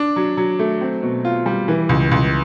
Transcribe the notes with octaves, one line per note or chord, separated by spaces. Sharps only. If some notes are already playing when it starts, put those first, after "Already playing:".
Already playing: D4
F#3
F#3
A3
C4
B2
F4
G3
E3
C#2
C#2